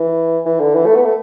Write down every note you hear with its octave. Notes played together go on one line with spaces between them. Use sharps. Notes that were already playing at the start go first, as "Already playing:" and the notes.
Already playing: E3
E3
D3
E3
A3
B3
A3